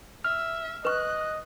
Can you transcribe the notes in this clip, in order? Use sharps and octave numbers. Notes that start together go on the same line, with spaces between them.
E5 F6
B4 D#5 C#6 F#6